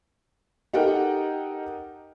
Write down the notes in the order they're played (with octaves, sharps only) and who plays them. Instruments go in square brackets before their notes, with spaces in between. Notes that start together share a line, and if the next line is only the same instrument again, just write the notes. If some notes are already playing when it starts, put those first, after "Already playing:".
[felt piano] D#4 G4 A4 A#4 F#5 G5